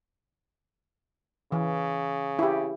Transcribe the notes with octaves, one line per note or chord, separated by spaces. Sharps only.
C#3 E3
E4 G4